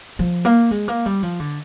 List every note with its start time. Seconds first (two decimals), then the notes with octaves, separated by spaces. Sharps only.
0.19 F3
0.45 A#3
0.71 G#3
0.88 A#3
1.06 G3
1.23 F3
1.40 D3